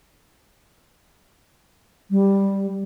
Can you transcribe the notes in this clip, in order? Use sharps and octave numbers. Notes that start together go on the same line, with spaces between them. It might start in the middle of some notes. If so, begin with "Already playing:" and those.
G3